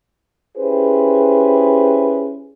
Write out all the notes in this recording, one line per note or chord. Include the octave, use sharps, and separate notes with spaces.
C#4 E4 G4 G#4 B4 C5